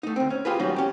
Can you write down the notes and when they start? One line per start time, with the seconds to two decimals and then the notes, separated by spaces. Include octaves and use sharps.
0.03 A3 D#4
0.16 D2 C4
0.30 C#4
0.45 F4 G4 G#4 B4
0.59 F#3 G3 C#4 D#4
0.76 C#4 G4